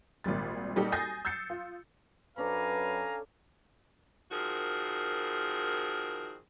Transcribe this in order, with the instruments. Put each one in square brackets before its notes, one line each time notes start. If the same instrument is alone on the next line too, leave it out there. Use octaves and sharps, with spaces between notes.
[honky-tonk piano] G#1 A#2 G3 A6
A#2 G3 D#4 F#4 G4 A4
G#5 D#6 G6 A6 A#6 C7
E6 G6 A6 C7 C#7
F4
[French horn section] F#2 B4 [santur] C#4 D4 A4 [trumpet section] F5 G#5 A#5
[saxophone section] D#3 F3 C4 F#4 G#4 A#4